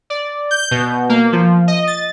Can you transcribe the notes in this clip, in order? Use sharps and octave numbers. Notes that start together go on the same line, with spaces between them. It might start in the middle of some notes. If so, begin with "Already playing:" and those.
D5
G6
B2
A#3
F3
D#5
A6